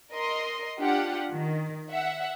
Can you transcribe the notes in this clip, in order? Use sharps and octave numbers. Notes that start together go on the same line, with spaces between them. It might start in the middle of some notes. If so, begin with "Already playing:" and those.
A#4 D#5 C6
D4 F4 G4 F#5
D#3
E5 F#5